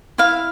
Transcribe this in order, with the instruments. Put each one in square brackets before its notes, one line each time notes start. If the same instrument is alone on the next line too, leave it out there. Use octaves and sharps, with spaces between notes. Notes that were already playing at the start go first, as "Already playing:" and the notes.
[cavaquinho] E4 F5